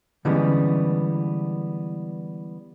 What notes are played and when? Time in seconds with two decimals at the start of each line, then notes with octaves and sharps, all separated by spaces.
0.25 D3 E3 G3 G#3 B3 C#4